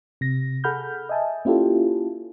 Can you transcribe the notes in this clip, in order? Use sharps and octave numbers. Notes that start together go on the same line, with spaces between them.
C3 A#6
G#4 A4 F#5 B5 F6 G6
D#5 E5 G#5 A5
A#3 C#4 E4 F4 G4 A4